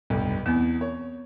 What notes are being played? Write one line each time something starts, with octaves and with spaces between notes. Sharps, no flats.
F1 B1 G2
E2 B3 C4
C#5